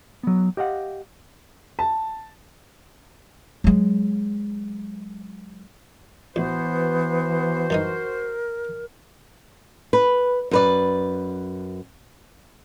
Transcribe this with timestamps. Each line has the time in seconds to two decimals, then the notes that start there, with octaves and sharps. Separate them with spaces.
0.23 F#3 B3
0.57 G4 D#5 F5 F#5
1.79 A5
3.64 F#3 G#3
6.36 A1 E3 B3 F#4 C5
7.70 F#2 D#3 D#4 A#4
9.93 B4
10.51 F#2 B4 D5